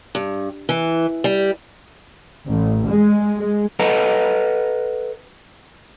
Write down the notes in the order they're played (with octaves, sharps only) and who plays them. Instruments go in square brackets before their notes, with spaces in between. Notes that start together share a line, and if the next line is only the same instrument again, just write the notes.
[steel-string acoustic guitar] G2
E3
G3
[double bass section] A1
G#3
G#3
[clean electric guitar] A4 B4 D#5 F#5 A5 A#5